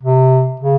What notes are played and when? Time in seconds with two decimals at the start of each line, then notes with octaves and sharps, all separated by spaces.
0.03 C3
0.60 C#3